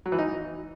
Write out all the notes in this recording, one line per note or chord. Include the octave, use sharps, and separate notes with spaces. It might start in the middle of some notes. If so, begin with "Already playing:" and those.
F#3
E3
D#4